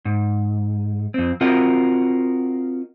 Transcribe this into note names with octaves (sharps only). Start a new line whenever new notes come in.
G#2
F2 C4
C4 F4 F#4 A#4 D#5 F#5